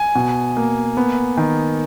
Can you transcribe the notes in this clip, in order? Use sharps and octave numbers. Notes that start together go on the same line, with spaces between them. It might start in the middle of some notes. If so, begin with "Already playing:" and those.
Already playing: G#5
B2
A#3
B3
D#3